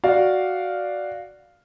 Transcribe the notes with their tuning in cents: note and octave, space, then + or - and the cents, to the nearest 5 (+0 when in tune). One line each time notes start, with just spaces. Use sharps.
F#4 +0 D5 +0 F5 +0